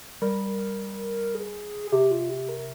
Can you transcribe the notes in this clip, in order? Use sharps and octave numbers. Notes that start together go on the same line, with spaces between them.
G3 A#4
G#4
G#4
C3 G4
F4
G4
A#4